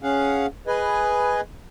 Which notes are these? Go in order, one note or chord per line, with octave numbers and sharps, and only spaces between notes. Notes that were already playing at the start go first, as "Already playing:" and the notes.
C#4 G#4 F5 F#5
G#4 B4 D#5 G#5